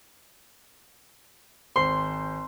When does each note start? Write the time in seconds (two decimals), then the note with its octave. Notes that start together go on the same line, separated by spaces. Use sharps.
1.76 G#1 C5 C6